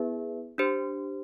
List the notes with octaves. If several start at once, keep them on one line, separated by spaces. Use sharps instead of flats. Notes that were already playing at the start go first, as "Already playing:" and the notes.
Already playing: B3 E4 G#4 B4 E5
D4 G4 C5